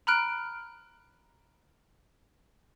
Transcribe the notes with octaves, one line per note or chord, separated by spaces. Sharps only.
A#5 B5 F6 F#6 D7